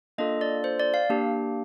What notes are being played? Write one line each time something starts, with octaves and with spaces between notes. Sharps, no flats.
A#3 D4 F4 A4 D#5
D5
C5
D5
F5
A#3 D4 G4